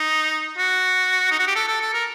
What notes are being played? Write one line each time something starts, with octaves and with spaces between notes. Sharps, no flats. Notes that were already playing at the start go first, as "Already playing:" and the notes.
Already playing: D#4
F#4
D#4
F#4
G4
A4
A4
A4
A#4